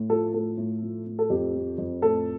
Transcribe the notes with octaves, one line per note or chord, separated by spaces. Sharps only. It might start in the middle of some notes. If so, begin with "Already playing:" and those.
Already playing: A2
F3 A4
A2 A4
A2
F3
A2
A4
F2 G4
F3
F2
A2 A4